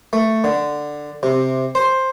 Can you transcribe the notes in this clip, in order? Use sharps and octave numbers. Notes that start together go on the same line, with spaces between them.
A3
D3
C3
C5